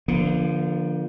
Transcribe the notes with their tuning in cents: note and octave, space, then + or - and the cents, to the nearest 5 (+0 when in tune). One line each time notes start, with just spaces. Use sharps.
D3 +0 F3 -10 A#3 +40